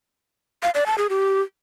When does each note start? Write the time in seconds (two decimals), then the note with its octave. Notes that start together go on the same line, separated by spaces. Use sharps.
0.63 F5
0.75 D5
0.86 A5
0.98 G#4
1.10 G4